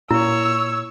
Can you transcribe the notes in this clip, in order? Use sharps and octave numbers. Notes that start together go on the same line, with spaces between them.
A#2 E4 C#5 E6